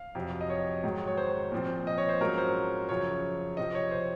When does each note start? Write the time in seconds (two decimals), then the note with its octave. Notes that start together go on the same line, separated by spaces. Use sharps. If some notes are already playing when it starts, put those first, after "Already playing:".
Already playing: F5
0.15 F2 C3 F#3
0.41 D#5
0.50 C#5
0.84 G#2 D#3 F#3
1.07 C#5
1.17 C5
1.52 A#2 F3 C4
1.87 D#5
1.98 C#5
2.09 C5
2.21 G#2 F#3 C#4 F4 A#4
2.38 C5
2.89 F#2 C#3 F3 C#5
3.57 C3 F3 C4 D#5
3.75 C#5
3.91 C5